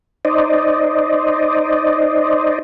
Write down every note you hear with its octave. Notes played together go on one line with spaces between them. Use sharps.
D#4 C5 D5 D#5